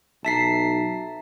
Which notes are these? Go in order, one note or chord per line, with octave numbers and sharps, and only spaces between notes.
B1 E5 A5 A#5 B6 C7